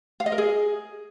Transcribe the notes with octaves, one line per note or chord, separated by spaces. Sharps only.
F5
D#5
A#4
G#4